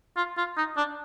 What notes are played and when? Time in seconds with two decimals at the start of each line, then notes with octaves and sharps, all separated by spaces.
0.16 F4
0.37 F4
0.57 D#4
0.77 D4